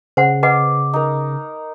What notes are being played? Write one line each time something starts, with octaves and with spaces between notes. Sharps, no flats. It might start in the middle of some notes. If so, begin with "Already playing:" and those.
C#3 C5 F#5
B4 D#5 F#5 D6
D#4 A#4